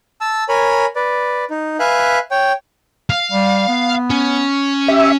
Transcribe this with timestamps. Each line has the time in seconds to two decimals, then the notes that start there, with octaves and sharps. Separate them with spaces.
0.21 A5 E6
0.49 A#4 C#5 G#5 B5
0.96 B4 D5
1.50 D#4
1.80 B4 E5 F5 G#5 F#6
2.31 C#5 G5
3.10 F5
3.32 G3
3.68 B3
4.10 C#4
4.88 G4 E5